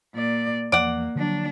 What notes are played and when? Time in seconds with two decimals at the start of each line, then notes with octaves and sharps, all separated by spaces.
0.14 A#2 D5
0.72 E2 F3 A#3 D5 F#5
1.15 D3 F3 F#3 A#3 D4